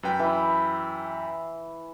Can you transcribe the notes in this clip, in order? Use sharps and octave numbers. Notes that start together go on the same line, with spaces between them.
F#2 B4 G5
E3